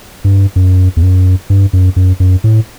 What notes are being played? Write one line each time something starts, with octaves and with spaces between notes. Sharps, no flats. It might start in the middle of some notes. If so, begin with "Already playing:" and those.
G2
F#2
E2
F#2
G2
F#2
F#2
F#2
A2